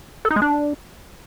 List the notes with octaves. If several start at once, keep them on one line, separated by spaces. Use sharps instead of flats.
A4
D#4
G#3
D4